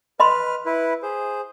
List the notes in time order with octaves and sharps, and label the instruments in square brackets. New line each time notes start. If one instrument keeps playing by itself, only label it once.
[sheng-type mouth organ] B4 F6 [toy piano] D#5 B5 C6
[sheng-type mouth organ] E4 B4
G#4 C5